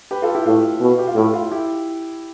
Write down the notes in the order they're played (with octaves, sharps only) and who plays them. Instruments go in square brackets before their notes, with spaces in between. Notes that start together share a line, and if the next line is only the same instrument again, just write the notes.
[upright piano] G4 B4
F4 A4
E4 G4
[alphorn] A2 [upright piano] F4
[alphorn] B2
[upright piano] G4
F4
[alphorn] A2 [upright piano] E4
[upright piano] F4
E4 G4